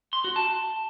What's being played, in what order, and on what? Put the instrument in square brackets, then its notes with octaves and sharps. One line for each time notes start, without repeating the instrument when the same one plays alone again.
[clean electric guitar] C6
F#4
A5